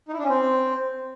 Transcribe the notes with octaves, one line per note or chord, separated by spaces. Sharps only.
D#4
E4
D4
C#4
C4